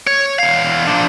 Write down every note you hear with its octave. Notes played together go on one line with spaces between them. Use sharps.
C#5
E2 F5
F3 D4